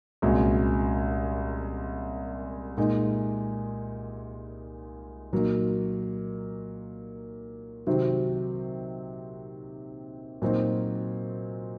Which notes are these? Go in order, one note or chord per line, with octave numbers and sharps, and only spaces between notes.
C2 A#2 G#3 C#4 F#4
A#2 G#3 D#4
A#2 F#3 A#3 D#4
C3 D#3 F#3 C4 F#4
A#2 F#3 C4 D#4 F#4